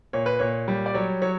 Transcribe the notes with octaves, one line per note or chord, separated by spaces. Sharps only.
A#2 C#5
B4
A#2 C#5
G3
D5
F#3 C#5
F#3 C#5